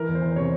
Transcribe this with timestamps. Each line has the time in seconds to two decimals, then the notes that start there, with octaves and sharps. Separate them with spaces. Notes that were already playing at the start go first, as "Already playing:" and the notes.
Already playing: E3 A#4
0.08 E2
0.15 C5
0.22 E3
0.36 C3 C#5